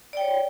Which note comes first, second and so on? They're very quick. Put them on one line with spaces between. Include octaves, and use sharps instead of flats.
D5 G5 C#5